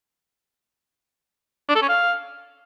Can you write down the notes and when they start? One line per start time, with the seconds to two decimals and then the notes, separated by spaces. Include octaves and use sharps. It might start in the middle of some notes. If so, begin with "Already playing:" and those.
1.69 D4
1.76 A4
1.82 C#4
1.89 F5